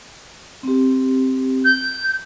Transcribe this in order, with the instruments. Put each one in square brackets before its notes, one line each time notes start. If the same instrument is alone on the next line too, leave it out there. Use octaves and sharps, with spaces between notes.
[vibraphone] C4 G4
[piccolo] G6